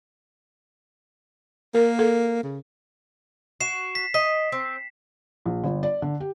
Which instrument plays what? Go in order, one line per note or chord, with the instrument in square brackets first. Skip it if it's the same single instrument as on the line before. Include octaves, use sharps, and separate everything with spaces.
[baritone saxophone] A#3 [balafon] A#4
[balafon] A4
[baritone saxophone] C#3
[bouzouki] F#4 [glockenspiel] C7 E7
[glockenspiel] B6
[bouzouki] D#5 [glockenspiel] B6
[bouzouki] C4
[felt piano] A#1
G1
D5
D3
G4